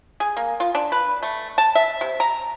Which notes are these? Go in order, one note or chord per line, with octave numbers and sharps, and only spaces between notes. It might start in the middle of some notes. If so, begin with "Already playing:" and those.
G#4
A#3
F4
D4
B4
A3
A5
E5
C3
A#5